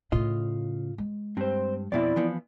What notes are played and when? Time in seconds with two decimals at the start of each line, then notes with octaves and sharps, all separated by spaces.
0.12 A2 C#3 F4 D#5
0.98 G#3
1.37 G2 C4 C5
1.92 F2 B2 C4 E4 D5 E5
2.16 E3 F3 B3